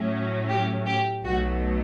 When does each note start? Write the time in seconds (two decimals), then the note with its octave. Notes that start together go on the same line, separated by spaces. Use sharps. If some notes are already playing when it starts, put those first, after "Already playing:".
Already playing: A2 F#3 A3 C#4
0.48 G4
0.86 G4
1.23 B1 B2 F#3 A3 F#4